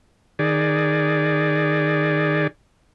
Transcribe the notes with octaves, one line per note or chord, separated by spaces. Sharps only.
D#3 G#4 D5